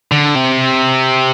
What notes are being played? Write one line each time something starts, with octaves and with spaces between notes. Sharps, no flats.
D3
C3